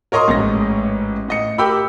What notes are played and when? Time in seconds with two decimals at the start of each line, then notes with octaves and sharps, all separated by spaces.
0.12 A#4 C#5 D#5 A#5 C6 D#6
0.28 A1 G#2 C#4 A#6
1.28 A2 D#5 C#7
1.58 G4 A#4 G5 B5 E6